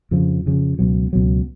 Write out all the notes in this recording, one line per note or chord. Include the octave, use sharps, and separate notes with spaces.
F2 C#3 F3
F2 C#3 F3
C#2 B2 F#3
C#2 B2 F#3